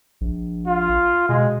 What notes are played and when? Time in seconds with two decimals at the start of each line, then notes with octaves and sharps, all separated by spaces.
0.21 A#1
0.67 F4
1.29 B2 G#3